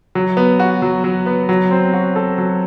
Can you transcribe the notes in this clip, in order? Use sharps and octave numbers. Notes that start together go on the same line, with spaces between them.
F#3
B3
F#4
F#3
F#3
B3
F#3
C4
F#4
A4
F#3